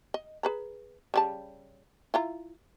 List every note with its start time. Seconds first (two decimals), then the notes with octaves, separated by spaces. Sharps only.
0.14 D#5
0.43 G#4 B4 A#5
1.14 C#3 G3 A5
2.14 E4 F4 A#5